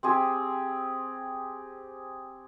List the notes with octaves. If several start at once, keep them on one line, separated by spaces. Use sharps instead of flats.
C4 G4 G#4